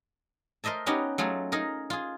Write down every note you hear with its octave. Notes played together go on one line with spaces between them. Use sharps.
A#4 C5 D#5 E5 A5
B3 C#4 D#4 F#4 G4
F#3 A3 F4 G#4
D#4 G#4 A#4
F4 G#4